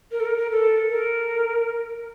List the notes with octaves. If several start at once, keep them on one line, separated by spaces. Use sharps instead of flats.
A#4
A4
A#4
A#4
A4
A#4